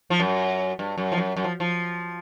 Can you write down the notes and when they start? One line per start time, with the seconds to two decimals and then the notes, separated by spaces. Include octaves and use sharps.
0.10 F3
0.20 F#2
0.79 G2
0.98 F#2
1.12 F3
1.18 F#2
1.36 F#2
1.44 F3
1.60 F3